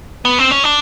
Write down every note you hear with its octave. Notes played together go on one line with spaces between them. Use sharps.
B3
C4
C#4
D4